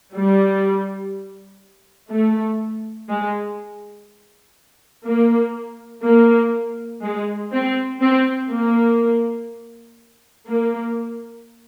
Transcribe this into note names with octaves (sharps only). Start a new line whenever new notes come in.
G3
A3
G#3
A#3
A#3
G#3
C4
C4
A#3
A#3